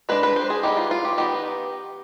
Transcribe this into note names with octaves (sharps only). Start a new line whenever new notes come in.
G#3 D4 B4
B4
C5
G#4
G3 B3 D#4 G4
F4
F4
G4
D#3 B3 D#4 G4